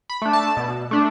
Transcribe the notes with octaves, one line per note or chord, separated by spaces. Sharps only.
B5
A3 D4
A5
B2
A3 D4